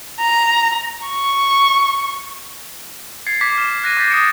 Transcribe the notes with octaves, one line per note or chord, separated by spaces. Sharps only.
A#5
C#6
G#6 A6 C7 C#7
D6 G#6 B6
F6 E7
F#6 A#6 D#7
D6 G6 A6 B6 C7
D#6 A6 C#7 D7